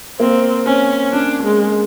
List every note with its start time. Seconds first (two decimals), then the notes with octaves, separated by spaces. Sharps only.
0.20 A#3 C4
0.66 C4 C#4
1.13 C#4 D4
1.43 G#3